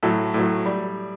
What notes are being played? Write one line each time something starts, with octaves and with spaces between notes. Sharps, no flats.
A2 F#3 A4
A2 F#3
G3